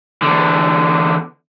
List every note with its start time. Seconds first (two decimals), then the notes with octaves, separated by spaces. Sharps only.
0.23 E2 D3